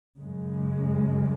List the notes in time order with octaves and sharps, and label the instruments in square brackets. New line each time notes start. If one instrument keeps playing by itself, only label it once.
[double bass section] F#2 C#3 G#3